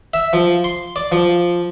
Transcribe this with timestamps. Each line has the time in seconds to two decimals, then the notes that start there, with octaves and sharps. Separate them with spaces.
0.14 E5
0.33 F3
0.64 C6
0.96 D5
1.12 F3